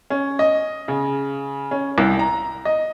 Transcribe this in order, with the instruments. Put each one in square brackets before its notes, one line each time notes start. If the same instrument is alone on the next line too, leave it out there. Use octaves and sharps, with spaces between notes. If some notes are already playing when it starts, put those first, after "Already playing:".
[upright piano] C#4
D#5
C#3
C#4
C2
A#5
D#5